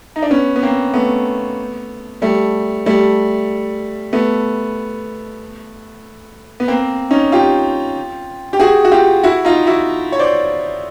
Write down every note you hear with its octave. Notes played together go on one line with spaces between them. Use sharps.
D#4
D4
B3 C#4
B3
A#3 C4
A3 B3
G3 A3
G3 A3
A3 B3
B3
A#3 C4
C#4 D#4
F4 G4
G4
F#4 G#4
F#4
F4 G4
E4 F#4
D#4 F4
E4 F#4
C#5
C5 D5